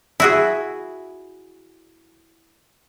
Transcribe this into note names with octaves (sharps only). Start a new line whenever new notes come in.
E4 F#4 G#4